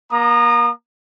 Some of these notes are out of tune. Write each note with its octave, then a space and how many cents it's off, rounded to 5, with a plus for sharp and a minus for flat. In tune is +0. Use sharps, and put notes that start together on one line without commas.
A#3 +35 A#5 +0 D#6 -35